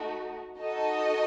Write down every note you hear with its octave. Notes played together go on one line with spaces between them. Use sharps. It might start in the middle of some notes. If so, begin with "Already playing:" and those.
Already playing: A3 D#4 F#4
D#4 F#4 A4 D#5